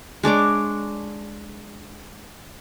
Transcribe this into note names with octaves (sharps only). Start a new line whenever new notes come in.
G#3 D4 C#5 D6